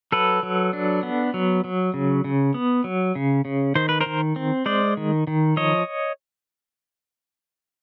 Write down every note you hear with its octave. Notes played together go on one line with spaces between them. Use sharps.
F#3 A4 B4
F#3
D4
B3
F#3
F#3
C#3
C#3
B3
F#3
C#3
C#3
D#3 C5
B4
A#4 C5
D#3
C4
G#3 C5 D5
D#3
D#3
F3 C#5 D#5